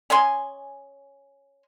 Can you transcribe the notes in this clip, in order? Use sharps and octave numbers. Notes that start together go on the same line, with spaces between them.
C#4 D#5 G#5 C6